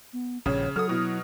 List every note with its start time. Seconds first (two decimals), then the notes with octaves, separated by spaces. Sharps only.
0.13 B3
0.46 A#1 G2 C#3 C#5
0.76 F#3 A4 D#6 F6
0.89 B2 E4